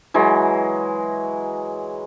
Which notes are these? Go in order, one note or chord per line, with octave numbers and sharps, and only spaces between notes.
E3 F#3 G#3